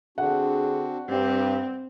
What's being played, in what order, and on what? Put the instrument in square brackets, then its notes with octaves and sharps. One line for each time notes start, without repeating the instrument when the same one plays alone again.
[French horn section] D3 G#4 [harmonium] C4 D4 F#4 [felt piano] F#5
[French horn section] G2 [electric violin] C4 [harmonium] G4